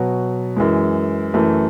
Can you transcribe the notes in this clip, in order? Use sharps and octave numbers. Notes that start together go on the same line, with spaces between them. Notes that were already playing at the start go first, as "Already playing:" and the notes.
Already playing: B2 F#3 B3 F#4
F#2 E3 G#3
F#2 E3 A3